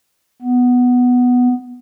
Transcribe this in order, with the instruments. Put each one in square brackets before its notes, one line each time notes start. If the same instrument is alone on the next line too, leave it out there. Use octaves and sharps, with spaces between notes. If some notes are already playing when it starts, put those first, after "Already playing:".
[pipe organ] B3